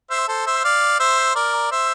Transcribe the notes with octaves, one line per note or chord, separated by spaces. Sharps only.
C5 E5
A4 C5
C5 E5
D5 F5
C5 E5
A#4 D5
C5 E5